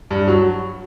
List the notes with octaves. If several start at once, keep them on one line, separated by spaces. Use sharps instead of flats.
G2
F#3